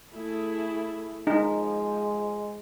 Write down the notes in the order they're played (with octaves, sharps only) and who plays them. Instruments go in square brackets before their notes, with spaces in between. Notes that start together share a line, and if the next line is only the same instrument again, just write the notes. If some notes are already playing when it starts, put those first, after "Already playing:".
[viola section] A3 E4 G#4
[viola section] F3 [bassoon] G#3 [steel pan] D#4